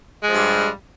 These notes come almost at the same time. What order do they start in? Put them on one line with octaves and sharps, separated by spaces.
G#3 F3 G2 G3